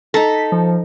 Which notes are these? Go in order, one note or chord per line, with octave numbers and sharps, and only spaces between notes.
D#4 A4 A#5 B6
F3